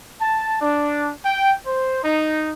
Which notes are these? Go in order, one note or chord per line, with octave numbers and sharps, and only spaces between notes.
A5
D4
G5
C5
D#4